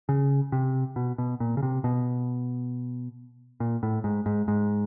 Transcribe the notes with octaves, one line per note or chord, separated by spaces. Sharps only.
C#3
C3
B2
B2
A#2
C#3
C3
B2
A#2
A2
G#2
G#2
G#2